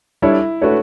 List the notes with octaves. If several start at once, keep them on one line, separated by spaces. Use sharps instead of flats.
G3 D4 E4 A4 C#5
A3 D4 F#4 A4 B4 C#5